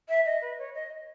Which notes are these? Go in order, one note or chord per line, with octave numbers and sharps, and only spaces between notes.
E5
D#5
B4
C#5
D#5